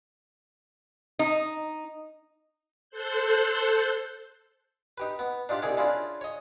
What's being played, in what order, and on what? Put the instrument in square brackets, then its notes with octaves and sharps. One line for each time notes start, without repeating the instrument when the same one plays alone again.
[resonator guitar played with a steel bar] D#4
[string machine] A4 C5 F#6 G6
[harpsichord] D#4 G4 B4
B3
D4 D#4 F4 G4 D5
C2 D#4 G#4 C#5 D6
C#4 D4 E4 F4 G#4
C#5 D#5